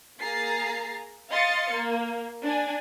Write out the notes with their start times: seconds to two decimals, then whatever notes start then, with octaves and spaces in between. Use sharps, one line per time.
0.22 A#3 G#4 A#5 A6 C7
1.30 D#5 F5 C6 A6 C#7
1.72 A#3
2.45 D4 G#5